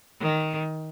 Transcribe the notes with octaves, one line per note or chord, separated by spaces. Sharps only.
D#3